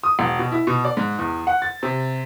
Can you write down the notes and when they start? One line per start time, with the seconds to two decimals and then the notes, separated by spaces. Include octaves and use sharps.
0.03 D#6
0.19 E1
0.39 B2
0.52 E4
0.67 B2
0.85 D5
0.97 G#2
1.18 E2
1.47 F#5
1.62 A6
1.83 C3